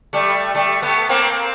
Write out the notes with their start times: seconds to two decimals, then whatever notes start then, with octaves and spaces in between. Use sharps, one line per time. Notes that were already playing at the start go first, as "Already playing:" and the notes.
0.13 G3 A3
0.55 G3 A3
0.82 A3 B3
1.09 A#3 C4